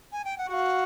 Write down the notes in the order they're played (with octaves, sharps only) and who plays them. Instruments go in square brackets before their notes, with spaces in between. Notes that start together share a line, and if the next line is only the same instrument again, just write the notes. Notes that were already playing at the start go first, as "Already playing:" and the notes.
[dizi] G#5
G5
F#5
[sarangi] F#4 [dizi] F5 F#5